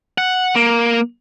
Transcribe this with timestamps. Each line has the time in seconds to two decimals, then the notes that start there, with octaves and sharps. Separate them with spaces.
0.18 F#5
0.55 A#3